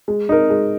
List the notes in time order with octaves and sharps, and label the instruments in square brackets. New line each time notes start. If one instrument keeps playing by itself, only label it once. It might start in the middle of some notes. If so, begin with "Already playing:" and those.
[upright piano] G#3
D#4 A#4
G#3